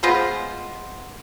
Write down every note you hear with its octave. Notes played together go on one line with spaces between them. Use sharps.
G#3 B3 F4 C5